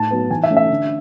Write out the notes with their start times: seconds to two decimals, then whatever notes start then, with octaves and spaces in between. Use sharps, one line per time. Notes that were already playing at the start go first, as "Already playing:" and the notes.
Already playing: A2 A5
0.11 F#3 B3
0.30 E3 G#5
0.43 E5
0.50 A3 C#4
0.57 E5
0.70 D3